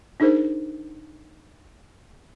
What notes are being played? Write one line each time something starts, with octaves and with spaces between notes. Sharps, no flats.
D4 D#4 G#4 A#4 C5